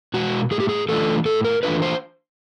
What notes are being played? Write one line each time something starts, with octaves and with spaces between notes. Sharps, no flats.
B2 G#3 F#4
A2 G#4
G4
G#4
E3 A3 D4 F4 A4
A2 A4
A#4
E3 A3 D4 F4 B4
C5